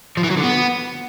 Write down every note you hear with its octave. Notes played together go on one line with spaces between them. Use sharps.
F3
E3
F#3
D3
B3